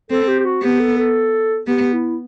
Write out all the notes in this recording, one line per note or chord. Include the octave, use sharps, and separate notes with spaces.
C4 A4
G4
G4
F#4
B3 G4
A4
A4
B3 G4
E4